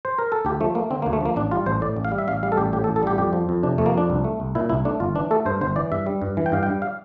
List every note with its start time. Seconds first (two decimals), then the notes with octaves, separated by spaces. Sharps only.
0.05 C5
0.18 A#4
0.32 A4
0.45 D2 G4
0.60 F3 A3
0.75 A3 A#3
0.90 D3 C4
1.02 A#3
1.06 D2
1.13 A3
1.21 F3 A#3
1.36 A1 D4
1.51 G3 F4
1.66 A1 C5
1.81 A2 D5
1.96 A1
2.05 F5
2.12 G3
2.18 E5
2.27 A1 F5
2.43 G3 F5
2.52 A4
2.57 A1 G4
2.73 A2 G4
2.84 A4
2.87 A1
2.96 A4
3.03 G3 G4
3.18 F2 G4
3.33 F3
3.49 F2
3.63 C3 D4
3.78 F2 A3
3.86 A#3
3.94 F3 D4
4.10 C2
4.24 A3
4.40 C2
4.55 A#2 E4
4.69 C2 E4
4.85 A3 D4
5.00 G1 F4
5.15 E3 D4
5.31 A3 A4
5.45 G2 C5
5.61 G1 C5
5.76 E3 D5
5.92 G2 E5
6.07 G3
6.22 G2
6.37 E3
6.46 G5
6.52 G2 F5
6.63 G5
6.67 G3
6.82 F5